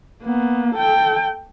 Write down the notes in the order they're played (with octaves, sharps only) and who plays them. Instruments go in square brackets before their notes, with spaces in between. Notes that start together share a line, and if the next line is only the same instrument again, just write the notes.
[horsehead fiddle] A#3 B3
A4 G5